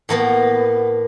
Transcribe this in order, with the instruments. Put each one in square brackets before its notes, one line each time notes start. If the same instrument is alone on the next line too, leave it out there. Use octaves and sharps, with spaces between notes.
[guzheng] A2 A#3 B3